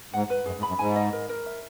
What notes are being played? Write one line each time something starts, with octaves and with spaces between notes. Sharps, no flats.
G#2 F#5
B4
F#2 G#4
G#2
B5
F#2
G#2 G#5
D#5
A#4
A#4
E5